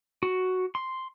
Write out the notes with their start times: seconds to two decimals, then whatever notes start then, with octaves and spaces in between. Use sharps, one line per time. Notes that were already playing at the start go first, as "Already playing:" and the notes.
0.23 F#4
0.75 C6